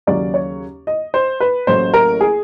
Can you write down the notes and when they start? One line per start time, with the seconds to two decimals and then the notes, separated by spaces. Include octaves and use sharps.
0.07 D#2 C#3 F#3 A#3 C#4 D5
0.34 C#5
0.87 D#5
1.14 C5
1.40 B4
1.67 A1 A2 F#3 A#3 C#4 C5
1.94 A#4
2.21 G#4